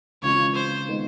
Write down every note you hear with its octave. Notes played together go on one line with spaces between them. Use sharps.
C#3 E3 G#3 C4 F4 C#5
C5
D#3 G#3 B3